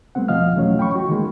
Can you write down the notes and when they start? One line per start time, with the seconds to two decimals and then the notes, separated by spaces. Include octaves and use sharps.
0.15 G3 A3 B3 C4 F#5
0.28 E2 B2 F3 D#5 F5 F6
0.56 E3 F#3 A3 C#4 C#5
0.79 G5 B5 C#6
0.95 F#4
1.09 D#3 E3 G#3 A#3